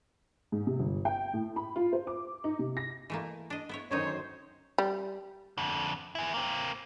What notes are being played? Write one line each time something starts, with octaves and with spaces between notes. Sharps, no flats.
G#2
C3
G1
G5
A2
B5
F4
C5
D6
D#4
C3
A#6
E3 A3 A#3
D4 D#5
B3 E4 C#5
F#2 D3 D#3 D#4 C5 C#5
G3
F2 D3
E4 G#4
A#3 C4